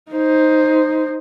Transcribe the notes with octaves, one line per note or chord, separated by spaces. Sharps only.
D#4 C5